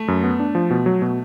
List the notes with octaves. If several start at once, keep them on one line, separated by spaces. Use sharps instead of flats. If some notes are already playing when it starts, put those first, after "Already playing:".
Already playing: A3
F#2
B3
D4
F3
B2
F#3
B2